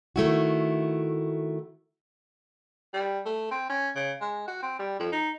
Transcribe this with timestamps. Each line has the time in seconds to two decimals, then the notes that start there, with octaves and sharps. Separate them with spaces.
0.16 D#3 A3 E4 F#4
2.93 G3
3.26 A3
3.51 C4
3.69 C#4
3.96 C#3
4.21 G#3
4.47 F#4
4.62 C4
4.79 G3
5.00 F2
5.12 D#4